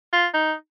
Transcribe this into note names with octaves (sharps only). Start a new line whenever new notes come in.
F4
D#4